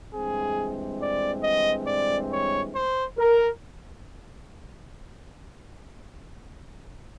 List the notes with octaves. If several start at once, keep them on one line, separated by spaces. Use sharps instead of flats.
G2 E3 G#3 C4 G#4
D5
D#5
D5
C#5
C5
A#4